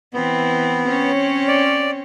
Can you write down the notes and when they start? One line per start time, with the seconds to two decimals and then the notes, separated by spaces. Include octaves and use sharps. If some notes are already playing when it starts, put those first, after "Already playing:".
0.14 E3 B3 C4 E4
0.86 C4 C#4 C#5
1.48 D5